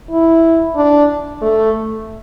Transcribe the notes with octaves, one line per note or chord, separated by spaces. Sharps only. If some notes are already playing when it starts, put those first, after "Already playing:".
E4
D4
A3